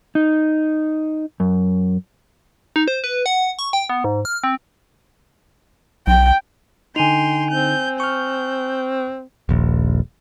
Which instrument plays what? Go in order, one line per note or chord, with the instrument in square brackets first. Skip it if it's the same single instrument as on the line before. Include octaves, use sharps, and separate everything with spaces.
[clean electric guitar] D#4
F#2
[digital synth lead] D#4
C5
B4
F#5
C#6
G5
B3
G#2
F6
C4
[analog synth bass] B1 [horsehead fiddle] G5
[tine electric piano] D3 D#4 [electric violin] G5 C6 [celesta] G#5 D#7 F7
[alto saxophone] C4 [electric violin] G6
[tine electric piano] C#6 F6 [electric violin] G6
[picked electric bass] D#1 A#1